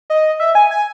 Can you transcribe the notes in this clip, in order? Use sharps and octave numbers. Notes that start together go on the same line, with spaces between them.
D#5
E5
G#5
G#5